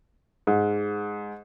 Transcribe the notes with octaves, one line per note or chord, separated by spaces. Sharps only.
G#2